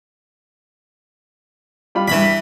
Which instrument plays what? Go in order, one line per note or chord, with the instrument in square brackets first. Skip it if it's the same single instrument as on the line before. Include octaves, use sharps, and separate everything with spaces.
[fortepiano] G3 F4 B5
[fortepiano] E2 G2 [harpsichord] E3 B5